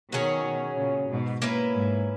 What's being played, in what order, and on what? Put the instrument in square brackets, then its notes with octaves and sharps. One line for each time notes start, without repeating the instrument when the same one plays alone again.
[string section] B2 D#3 [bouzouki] F#3 C#4 G#4
[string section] A#2 C#3
G#2 B2
[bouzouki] A#3 C#4 E4 B4
[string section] G#2